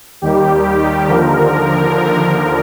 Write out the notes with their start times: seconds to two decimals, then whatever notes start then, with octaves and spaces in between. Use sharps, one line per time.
0.22 D#2 D#3 G3 G4
1.08 D#2 D3 F3 A#4